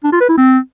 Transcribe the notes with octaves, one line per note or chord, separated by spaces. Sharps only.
D4
F4
B4
E4
C4